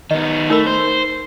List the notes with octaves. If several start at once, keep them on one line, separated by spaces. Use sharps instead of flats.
D#3 B3 D#5
A3 D#4 A#4 B5
C5